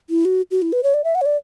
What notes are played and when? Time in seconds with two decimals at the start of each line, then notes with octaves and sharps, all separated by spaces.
0.10 E4
0.25 F#4
0.51 F#4
0.62 E4
0.73 B4
0.83 C#5
0.94 D5
1.04 E5
1.15 F#5
1.21 C#5
1.26 D5